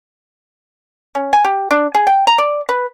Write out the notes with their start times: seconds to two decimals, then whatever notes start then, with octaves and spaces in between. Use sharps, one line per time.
1.15 C#4
1.33 G#5
1.44 G4
1.71 D4
1.95 G#4
2.07 G5
2.27 A#5
2.38 D5
2.69 B4